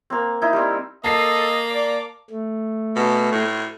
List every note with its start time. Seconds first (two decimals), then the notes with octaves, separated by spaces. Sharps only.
0.10 A#3 C4
0.42 D#4 E4
0.53 G3 C4
1.04 A#3 A4 D#5 A5 C7
1.70 D5 D6
2.30 A3
2.96 B2
3.32 A2